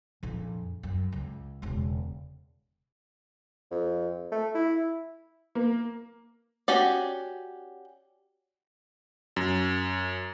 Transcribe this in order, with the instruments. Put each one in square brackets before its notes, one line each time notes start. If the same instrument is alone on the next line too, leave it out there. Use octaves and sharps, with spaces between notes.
[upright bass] A#1 F2
F#2
C#2
E1 C#3
[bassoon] F2
A3
E4
[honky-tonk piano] A#3
[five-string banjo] C#4 F#4 G4 D5
[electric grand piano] F#2